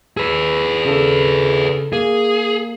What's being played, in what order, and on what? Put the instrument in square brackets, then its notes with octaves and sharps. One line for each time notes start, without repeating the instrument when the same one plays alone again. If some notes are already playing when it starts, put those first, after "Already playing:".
[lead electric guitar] G#4 B4 [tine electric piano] E6
[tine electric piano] C#3 A4
[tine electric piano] A#3 [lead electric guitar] G#4